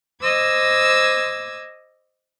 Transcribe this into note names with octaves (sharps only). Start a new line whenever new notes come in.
C5 D#5 D6 E6 G#6